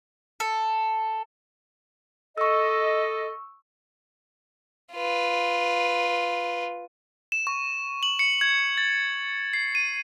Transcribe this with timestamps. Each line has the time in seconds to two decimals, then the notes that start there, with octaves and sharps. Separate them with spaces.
0.40 A4
2.38 A4 D#5 C#6 E6
4.94 F4 B4
7.32 E7
7.47 C#6
8.03 F#7
8.19 C#7
8.41 G#6
8.78 A6
9.53 C7
9.75 D#7